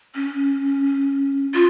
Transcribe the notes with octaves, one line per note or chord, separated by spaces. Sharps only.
C#4
F4